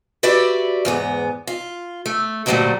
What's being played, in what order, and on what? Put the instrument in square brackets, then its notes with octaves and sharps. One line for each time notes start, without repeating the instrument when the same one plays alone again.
[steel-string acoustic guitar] F#4 G4 B4 D5 E5
E2 G#2 B3
F4
A3
D2 G2 A#2 F#3 G3 A3